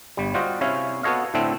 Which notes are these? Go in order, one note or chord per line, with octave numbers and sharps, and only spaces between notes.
G1 G3
G3 F4 F#4 C5 D#5
C3 C#4 E4 C#5 F5
B3 F#4 A4 C#5 D#5 F5
A2 D3 A3 C4 E4 A4